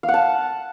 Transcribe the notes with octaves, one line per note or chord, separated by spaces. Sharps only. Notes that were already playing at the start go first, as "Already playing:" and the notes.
F5
F#5
A5